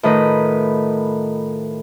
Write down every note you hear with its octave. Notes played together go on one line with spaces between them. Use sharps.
A2 D#3 F4 B4 D#5